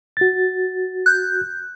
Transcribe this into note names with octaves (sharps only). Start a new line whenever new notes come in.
F#4 A6
F#6 G6